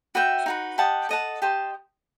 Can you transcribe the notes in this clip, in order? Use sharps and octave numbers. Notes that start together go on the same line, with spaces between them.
F#4 B4 E5 G5
D#4 F#4 B4
G4 D#5 F#5 A5
A4 D#5 F#5 A5
G4 D#5 A5 C6